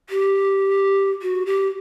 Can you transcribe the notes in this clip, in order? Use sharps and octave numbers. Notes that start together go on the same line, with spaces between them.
G4
F#4
G4